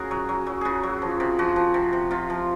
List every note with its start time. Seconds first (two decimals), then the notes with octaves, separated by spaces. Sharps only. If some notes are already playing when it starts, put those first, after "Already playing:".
Already playing: C#3 F#4 G#4 A#4
0.11 F#3
0.29 F#3
0.47 F#3
0.61 C#3 F#4 G#4
0.83 F#3
1.02 F3
1.20 C3
1.39 F3 F#4
1.56 F3
1.74 C3
1.93 C3
2.11 C3 F4
2.30 F3